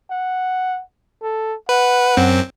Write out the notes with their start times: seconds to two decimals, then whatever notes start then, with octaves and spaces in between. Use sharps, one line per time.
0.11 F#5
1.22 A4
1.69 B4 F#5
2.17 F#2 C4